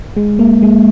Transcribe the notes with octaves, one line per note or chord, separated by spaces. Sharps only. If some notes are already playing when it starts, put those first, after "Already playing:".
G#3
A#3
G#3